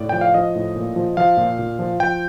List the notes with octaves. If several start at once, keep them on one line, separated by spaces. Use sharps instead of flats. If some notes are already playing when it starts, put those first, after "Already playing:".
Already playing: A2 D5
F3 G5
F5
F3 D#5
A2
A#2
F3
F3 F5
A#2
A#2
F3
F3 G5